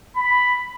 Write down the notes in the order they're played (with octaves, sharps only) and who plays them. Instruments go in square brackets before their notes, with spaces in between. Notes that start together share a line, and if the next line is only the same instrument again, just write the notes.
[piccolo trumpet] B5